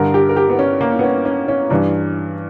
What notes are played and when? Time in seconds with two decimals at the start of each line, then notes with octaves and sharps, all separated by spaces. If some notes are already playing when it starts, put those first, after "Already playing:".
Already playing: G2 D3 A#4
0.14 G4
0.29 A#4
0.37 G4
0.50 B3
0.59 C#4
0.81 A#3
0.99 B3
1.04 C#4
1.25 C#4
1.48 C#4
1.70 G2 E3 D4